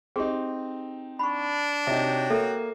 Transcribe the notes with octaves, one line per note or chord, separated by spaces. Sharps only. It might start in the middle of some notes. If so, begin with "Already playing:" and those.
C4 D#4 G4 G#4
D4 B5 C#6
C3 D#4 F#4 C#5 E5 G5
A#3 A4 E5